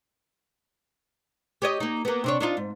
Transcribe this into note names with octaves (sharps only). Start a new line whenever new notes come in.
G4 C#5 D#5
A#3 D#4
A#3 B3
C3 D4 C#5
D4 D#4 F4
G#2